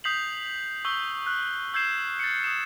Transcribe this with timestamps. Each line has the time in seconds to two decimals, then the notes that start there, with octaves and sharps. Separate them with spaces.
0.04 D#6 G6 B6 C7 F7 F#7
0.85 C#6 E6 G6 G7
1.26 F6 F#6
1.74 E6 G6 G#6 C7 E7
2.19 A6 C#7
2.44 D#6 E7